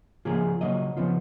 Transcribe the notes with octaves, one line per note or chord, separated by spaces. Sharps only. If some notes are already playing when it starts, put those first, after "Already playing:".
C#3 F3 A#3 C#4 F4 G#4
C#3 F#3 A#3 D#5
C#3 F3 B3 F4